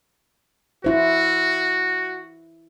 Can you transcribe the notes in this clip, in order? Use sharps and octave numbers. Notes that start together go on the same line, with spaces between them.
E4 F#4 C5